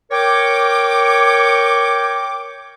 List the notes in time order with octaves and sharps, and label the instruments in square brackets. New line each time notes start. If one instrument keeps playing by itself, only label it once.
[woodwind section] A#4 C#5 G5 D6